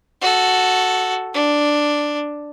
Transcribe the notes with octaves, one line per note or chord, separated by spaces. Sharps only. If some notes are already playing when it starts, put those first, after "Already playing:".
F#4 A4
D4